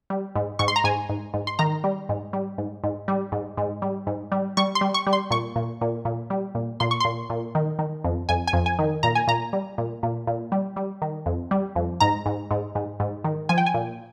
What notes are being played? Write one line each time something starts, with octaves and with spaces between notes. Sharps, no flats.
G3
G#2
G#2 C#6
C6
A#5
G#2 G#5
G#2
G#2
C6
D#3 A#5
G3
G#2
G3
G#2
G#2
G3
G#2
G#2
G3
G#2
G3
G3 C#6
C6
G3
C#6
G3
C6
A#2 C#6
A#2
A#2
A#2
G3
A#2
A#2 C6
C#6
A#2 C6
A#2
D#3
D#3
F2
F2 G#5
G#5
F2
G#5
D#3
A#2 A#5
G#5
A#2 A#5
G3
A#2
A#2
A#2
G3
G3
D#3
F2
G3
F2
G#2 A#5
G#2
G#2
G#2
G#2
D#3
F3 G#5
G5
G#5
A#2